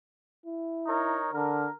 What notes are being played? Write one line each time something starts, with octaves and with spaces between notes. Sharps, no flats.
E4
D#4 A#4 C#5
D3 A#4